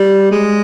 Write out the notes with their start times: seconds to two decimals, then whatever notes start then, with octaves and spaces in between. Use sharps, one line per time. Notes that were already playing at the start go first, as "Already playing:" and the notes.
Already playing: G3
0.31 G#3